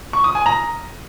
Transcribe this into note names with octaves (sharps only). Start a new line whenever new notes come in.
C#6
D#6
G#5
A#5